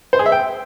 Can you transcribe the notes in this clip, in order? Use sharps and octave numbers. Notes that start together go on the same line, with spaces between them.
C5
G#4
E5
G5